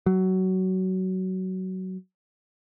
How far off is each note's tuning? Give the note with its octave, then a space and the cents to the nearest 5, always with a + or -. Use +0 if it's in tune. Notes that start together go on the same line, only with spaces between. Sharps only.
F#3 +15